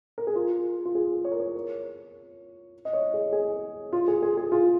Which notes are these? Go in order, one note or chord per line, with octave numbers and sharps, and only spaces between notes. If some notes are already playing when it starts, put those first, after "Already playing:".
A#4
G#4
F4
F4
G#4
C#5
A#4
C#5
D#5
C#5
G#4
G#4
F4
G#4
G#4
G#4
F4